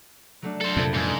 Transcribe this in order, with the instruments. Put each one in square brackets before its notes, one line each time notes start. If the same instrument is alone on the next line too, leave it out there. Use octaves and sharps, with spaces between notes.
[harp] F#3 A3 D4
[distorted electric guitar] A4 C5
[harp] C2 [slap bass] F2 A#2
[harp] C#2 E6 [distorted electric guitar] G#2